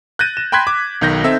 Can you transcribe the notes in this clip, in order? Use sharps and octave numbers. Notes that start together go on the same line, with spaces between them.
F#6 G6 A6 A#6 D#7
E7
G5 B5 C6 F#6 G#6 B6
D6
B1 D#3 G6 A#6
C4 D#4 A4 E5